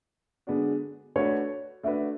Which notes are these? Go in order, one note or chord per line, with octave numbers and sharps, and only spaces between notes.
D3 G#3 B3 D4 F#4
A3 D4 F#4 B4 C#5
A3 D4 F#4 B4 E5